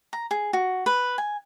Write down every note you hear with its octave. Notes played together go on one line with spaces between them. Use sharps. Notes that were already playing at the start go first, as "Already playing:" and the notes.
A#5
G#4
F#4
B4
G#5